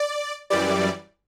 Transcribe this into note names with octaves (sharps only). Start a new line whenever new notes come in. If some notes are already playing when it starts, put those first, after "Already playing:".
Already playing: D5
F#2 E3 G3 D5